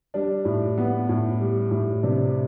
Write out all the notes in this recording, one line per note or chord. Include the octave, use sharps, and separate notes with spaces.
G3 D4
A2
B3
A2
G3
A2
C3 D4